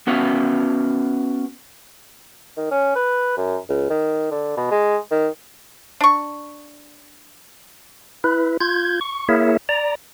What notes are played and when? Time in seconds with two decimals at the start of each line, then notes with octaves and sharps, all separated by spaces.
0.07 B3 C#4 F#4 B4 E5 F5
2.57 D#3
2.71 C#4
2.95 B4
3.37 F#2
3.70 C#2
3.90 D#3
4.31 D3
4.57 B2
4.71 G#3
5.11 D#3
6.01 D4 C#6
8.24 E4 B4
8.61 F4 G6 G#6
9.01 C#6
9.29 A#3 E4 G#4 A#4 C#5 E5
9.69 D5 A#5